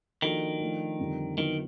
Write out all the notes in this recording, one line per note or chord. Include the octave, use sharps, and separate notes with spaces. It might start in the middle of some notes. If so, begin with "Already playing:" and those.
D#3 F3 A#3 D4 F#4 A4
F3 A3 D4
F2 D3 G3 C4
D3 D#3 F#3 B3 E4